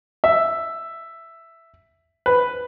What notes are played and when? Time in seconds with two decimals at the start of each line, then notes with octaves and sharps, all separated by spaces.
0.24 E5
2.26 B4